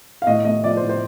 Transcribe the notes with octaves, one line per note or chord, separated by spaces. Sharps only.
F5
A2 D#5
A3 D#5
F3 D5
C5
A2
C5